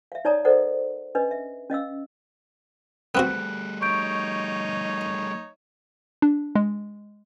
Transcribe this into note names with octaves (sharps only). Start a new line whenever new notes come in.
E5 F5
D#4 C#5 D5 A5 A#5 D#6
A4 A#4 C5 D5 D#5 F#5
C#4 D4 B4 D#5
E5
C#4 D#5 F5 E6
G3 A3 B3 C4 F#4 F#6
D#4 C#5 C#6 G6 D7
D4
G#3